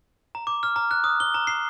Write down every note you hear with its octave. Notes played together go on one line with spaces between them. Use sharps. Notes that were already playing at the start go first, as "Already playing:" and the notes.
A#5
D6
F6
A#5
F#6
D#6
G7
A#5
C7